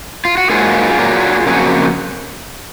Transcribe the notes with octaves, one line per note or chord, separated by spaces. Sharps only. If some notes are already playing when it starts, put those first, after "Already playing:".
F4
F#4
G#2 F#3 A#3 F4 G#4
A#2 F#3 A#3
F2 C#3 F#3 A#3 G#4
F#4